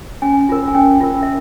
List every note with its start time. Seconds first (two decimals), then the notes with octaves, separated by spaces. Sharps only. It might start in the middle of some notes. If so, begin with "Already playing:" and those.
0.22 C#4 G#5
0.49 F4 A#4
0.68 G#5
0.75 C#4 G5
1.01 F4 A#4
1.23 E5